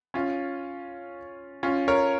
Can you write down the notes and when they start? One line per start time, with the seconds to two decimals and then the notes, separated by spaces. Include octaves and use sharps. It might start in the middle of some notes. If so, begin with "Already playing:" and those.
0.14 C#4 F4
1.63 C#4 F4
1.88 A#4 C#5